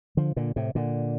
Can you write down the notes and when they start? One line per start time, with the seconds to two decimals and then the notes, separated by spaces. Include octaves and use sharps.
0.17 D3 F3
0.36 A#2 D3
0.56 A2 C3
0.75 A#2 D3